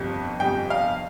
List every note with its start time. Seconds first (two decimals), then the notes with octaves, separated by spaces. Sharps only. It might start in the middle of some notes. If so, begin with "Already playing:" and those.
Already playing: G1 F2 C3
0.39 G1 F2 C3 G5
0.70 F5